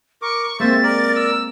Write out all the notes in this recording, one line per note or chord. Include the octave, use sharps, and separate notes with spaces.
A#4 C#6 D6
G#3 A#3 C4 F4 C5 E5 A6
A#4 D5
E6